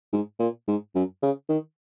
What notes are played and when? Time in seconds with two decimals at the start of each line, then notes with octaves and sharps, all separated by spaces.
0.13 G#2
0.39 A#2
0.68 G#2
0.95 F#2
1.22 C#3
1.49 D#3